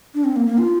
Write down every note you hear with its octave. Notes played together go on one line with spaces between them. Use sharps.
D4
C4
A#3
A#3
F4